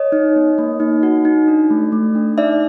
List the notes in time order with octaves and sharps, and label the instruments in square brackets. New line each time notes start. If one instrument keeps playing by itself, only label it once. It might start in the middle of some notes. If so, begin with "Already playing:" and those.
Already playing: [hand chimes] C#5 D#5
D#4
B3
A#3
D#4
F#4
D#4
D4
A3
A3
D4
D#4 D5 E5